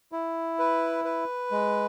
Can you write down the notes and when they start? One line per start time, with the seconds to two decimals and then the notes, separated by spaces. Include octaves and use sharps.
0.12 E4
0.59 B4
1.05 B4
1.51 G#3